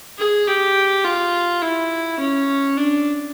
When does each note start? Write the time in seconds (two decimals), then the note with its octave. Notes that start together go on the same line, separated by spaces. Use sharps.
0.18 G#4
0.47 G4
1.04 F4
1.62 E4
2.19 C#4
2.77 D4